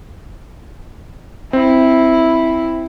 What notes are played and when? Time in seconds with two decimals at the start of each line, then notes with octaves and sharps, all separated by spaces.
1.53 C4 E4